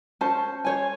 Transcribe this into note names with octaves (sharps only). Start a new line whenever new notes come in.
C#4 C5 A5
C5 C#5 G#5